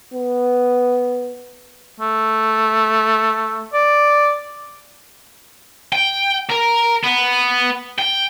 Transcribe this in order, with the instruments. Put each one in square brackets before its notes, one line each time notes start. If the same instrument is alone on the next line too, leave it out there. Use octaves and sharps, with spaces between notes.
[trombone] B3
[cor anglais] A3
D5
[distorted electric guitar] G5
A#4
B3
G5